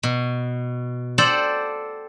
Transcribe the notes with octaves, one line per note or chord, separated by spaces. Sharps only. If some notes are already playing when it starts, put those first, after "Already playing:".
B2
A4 C5 D5 F#5 G5